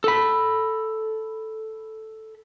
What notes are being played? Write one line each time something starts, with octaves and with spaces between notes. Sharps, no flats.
A4 B5